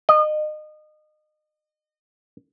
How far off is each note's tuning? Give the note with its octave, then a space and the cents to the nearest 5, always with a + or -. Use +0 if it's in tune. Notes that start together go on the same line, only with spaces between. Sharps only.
D#5 -30